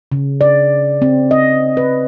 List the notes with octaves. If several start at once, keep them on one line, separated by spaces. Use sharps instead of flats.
C#3
D5
C4
D#5
B4